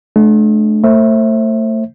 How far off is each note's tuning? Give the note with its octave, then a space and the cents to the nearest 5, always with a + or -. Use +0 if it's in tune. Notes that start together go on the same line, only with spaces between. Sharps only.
A3 -40 D4 +10
A3 +30 C5 +35 E5 -5